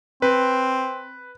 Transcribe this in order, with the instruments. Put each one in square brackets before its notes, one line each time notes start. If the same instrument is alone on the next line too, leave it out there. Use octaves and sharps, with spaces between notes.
[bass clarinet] C4 [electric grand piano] B4